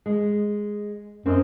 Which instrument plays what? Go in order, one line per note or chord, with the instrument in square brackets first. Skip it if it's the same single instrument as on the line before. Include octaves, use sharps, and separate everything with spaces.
[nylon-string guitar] G#3
[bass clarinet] F#2 [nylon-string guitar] C4 D#5